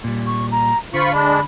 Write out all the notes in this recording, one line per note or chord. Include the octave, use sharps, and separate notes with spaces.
A#2 G3
C#6
A#5
D3 F4 C5 B5 C#6
G#3 D4 B5